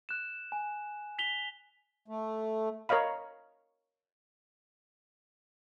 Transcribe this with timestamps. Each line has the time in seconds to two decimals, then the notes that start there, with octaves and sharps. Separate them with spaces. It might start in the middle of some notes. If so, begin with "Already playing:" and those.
0.09 F#6 E7
0.52 G#5
1.19 B6 F7 G7
2.08 A3
2.89 A#4 C#5 D#5 F5 B5